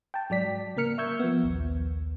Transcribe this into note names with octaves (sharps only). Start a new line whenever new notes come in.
G5 A5
G#2 F#3 D5 B6
C#3 A#3 A#4 F6 C#7
E5 C#6 E6 G6 G#6
F3 B3
A#1 D#2